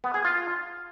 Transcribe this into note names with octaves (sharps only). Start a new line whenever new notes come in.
B3
G#4
F4